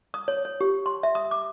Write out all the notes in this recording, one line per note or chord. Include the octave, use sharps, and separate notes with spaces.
D#6
C#5
C#5
G4
C6
E5
D#6
D6